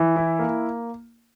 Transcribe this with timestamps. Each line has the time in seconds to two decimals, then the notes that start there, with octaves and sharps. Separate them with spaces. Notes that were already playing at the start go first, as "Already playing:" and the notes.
Already playing: E3
0.16 E4
0.39 A#3